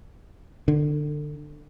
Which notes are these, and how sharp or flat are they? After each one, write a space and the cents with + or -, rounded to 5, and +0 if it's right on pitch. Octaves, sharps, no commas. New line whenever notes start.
D3 +25